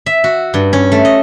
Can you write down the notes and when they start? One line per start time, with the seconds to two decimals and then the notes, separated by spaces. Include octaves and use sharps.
0.06 E5
0.24 F#4
0.54 G2
0.73 C#4
0.92 A3
1.05 D#5